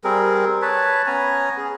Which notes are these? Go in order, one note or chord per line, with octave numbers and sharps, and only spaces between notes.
G3 C4 G#4 A#4
B4 C#5 A5 B5
B3 C#4 G#5 A#5
G#4